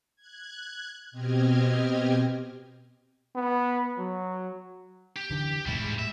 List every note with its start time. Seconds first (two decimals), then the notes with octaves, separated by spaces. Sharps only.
0.16 F#6 G#6
1.11 B2 C4 G4 D#5 F6 G#6
3.35 B3
3.98 F#3
5.16 G4
5.31 D3 E3
5.66 E1 C2 G#2 G3 E4
5.82 A2 G#3
5.99 E5